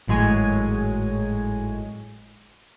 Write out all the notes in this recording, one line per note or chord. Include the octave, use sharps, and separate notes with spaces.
G#1 A2 F#3 G#3 C#5 G#5